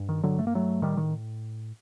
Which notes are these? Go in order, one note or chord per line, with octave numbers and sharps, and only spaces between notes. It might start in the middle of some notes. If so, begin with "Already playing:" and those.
Already playing: G2
D#3
D3 F#3
A3
A#3
F#3 A3
A2 D#3 G3
D#3